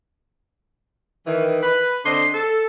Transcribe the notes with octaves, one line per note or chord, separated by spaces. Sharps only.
D#3 E3
B4
D3 C4 D4 D#5 C6
A4